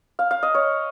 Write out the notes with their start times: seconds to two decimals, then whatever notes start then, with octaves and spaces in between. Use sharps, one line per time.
0.19 F5
0.31 F5
0.43 D#5
0.54 C#5